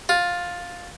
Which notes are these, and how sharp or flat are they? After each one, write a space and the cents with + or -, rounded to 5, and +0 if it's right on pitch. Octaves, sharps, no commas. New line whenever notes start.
F4 +10